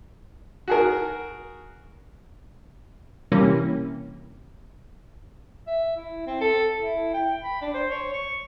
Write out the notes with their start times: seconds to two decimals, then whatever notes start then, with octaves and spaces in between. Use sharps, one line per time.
0.68 F#4 G#4 A#4
3.32 C3 E3 G3 A#3 C#4
5.67 E5
5.97 E4
6.27 C4
6.41 A4
6.78 E4
7.14 G5
7.43 B5
7.61 D4
7.74 C5
7.90 C#5
8.13 C#6